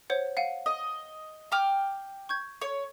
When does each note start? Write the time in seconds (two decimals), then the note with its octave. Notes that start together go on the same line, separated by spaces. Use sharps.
0.10 C5 C#5 F#5
0.37 F5 F#5 D#7
0.66 D#5
1.52 G5 D6 F6
2.29 C#6 G6 G#6
2.61 C#5